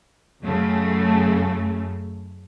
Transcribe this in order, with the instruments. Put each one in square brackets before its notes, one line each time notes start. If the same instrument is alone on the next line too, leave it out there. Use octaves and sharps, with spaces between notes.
[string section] F#2 C#3 A3